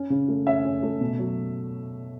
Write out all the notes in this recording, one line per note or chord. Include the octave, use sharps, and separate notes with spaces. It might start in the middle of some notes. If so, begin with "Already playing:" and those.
Already playing: C#4
C#3
A3
C#4 E5
C#4
A3
B2
F#3